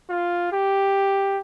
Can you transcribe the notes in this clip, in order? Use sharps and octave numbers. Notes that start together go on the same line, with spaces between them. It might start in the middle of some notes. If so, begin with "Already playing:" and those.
F4
G4